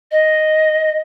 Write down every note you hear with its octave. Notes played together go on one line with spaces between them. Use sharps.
D#5